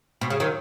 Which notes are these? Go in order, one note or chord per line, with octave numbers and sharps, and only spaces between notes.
B2
C#3
D#3 F#3